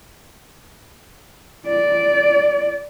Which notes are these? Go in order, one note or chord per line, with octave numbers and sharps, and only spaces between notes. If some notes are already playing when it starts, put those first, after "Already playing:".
D5